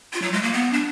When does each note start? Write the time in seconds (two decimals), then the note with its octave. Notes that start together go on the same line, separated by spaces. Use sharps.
0.13 F4
0.22 F#3
0.32 G#3
0.42 A#3
0.53 B3
0.73 D4